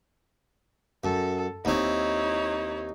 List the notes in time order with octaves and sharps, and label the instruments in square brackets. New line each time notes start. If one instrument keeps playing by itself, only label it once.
[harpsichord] F#2 [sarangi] A4
[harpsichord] D#2 C4 [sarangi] D#4 [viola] E4 C#5